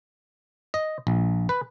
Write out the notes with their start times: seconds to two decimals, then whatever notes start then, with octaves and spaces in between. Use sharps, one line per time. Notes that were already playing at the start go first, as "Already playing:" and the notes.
0.74 D#5
1.07 A#1
1.49 B4